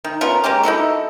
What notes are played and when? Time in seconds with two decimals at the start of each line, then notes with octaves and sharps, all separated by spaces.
0.04 D#3
0.21 B3 C#4 F4 A#4
0.44 G#3 A#3 C#4 G4
0.63 D#4 E4 F#4 A4